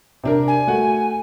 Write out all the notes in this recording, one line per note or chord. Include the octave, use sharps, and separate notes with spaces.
C3 D4 A#4
G#5
A3 F#4 F#5